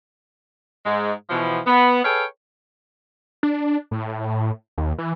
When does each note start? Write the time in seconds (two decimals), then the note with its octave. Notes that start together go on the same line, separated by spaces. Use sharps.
0.85 G#2 G#3
1.30 B2 E3 F3
1.66 B3
2.04 G#4 A4 B4 C#5 F5 G5
3.43 D4
3.91 A2
4.78 D#2
4.98 E3